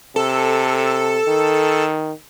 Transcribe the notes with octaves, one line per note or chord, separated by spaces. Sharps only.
C3 A4
D#3